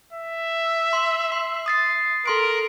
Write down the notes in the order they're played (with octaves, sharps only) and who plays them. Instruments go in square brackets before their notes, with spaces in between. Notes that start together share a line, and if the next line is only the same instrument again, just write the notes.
[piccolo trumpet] E5
[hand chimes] C6
C6
D#6 A6 C7
[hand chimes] A4 C6 D7 [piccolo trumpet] A#4